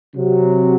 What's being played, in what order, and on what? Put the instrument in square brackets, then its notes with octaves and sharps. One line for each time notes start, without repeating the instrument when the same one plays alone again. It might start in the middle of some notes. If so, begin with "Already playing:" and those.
[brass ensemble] C3 F#3